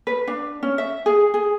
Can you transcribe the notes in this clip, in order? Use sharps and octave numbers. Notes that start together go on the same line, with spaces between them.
B4
D4
C#4
E5
G#4
G#4